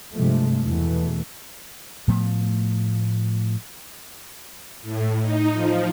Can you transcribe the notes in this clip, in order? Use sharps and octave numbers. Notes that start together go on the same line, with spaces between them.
G2 C3 F3 G#3 A3
E2 B2 E3 A3
A2 F3 A3 B3
A2
D#4
F3